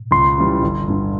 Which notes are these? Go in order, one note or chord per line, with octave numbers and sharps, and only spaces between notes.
C#2 C6
C#3 E3 G3
G1
G2 D3